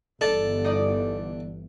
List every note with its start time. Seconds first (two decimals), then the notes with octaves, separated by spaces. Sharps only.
0.21 G1 E3 D4 A4 A6
0.64 D#4 D5